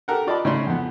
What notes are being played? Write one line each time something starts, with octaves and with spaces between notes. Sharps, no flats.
G4 A4 A#4 F#5
F4 D5 D#5 A5 B5
C#3 D#4 E4 C#5 B5 C6
F2 B3